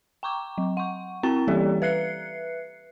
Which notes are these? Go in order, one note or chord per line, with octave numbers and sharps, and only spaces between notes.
G5 A#5 C#6 D6
F#3
F#5 C#6
C4 E4 G5 A#5 A6
E3 G3 A#3 G4 A4 D5
B4 E5 F#6 C7 C#7